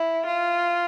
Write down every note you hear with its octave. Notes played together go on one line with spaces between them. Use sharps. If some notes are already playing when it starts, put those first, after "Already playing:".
Already playing: E4
F4